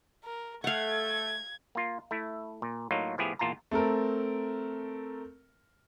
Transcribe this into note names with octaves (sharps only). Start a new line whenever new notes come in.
A#4
A3 F5 F#5 G#6
A#3 F4
A3 E4
A#2
A2 F#3 A#3 D#4 F4
A2 F3 B3 E4 G4 G#4
E2 A#2 F4 A5 A#5
A3 C4 A4 A#4